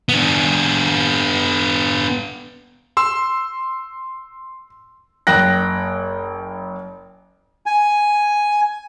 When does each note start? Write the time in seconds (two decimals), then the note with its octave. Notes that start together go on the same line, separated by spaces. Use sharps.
0.09 B3 D4
2.97 C6 E6
5.27 F#1 G5 F#6 A#6
7.66 G#5